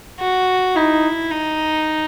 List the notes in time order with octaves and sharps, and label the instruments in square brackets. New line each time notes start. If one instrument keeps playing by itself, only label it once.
[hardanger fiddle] F#4
[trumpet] D#4 [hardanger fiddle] E4
[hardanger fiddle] D#4